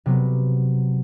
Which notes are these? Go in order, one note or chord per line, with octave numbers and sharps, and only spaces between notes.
C3 F#3 B3